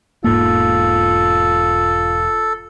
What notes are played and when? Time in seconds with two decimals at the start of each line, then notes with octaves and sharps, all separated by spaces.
0.24 E1 G#2 A#3 F4 A4